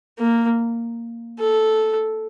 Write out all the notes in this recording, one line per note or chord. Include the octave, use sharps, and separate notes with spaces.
A#3
A4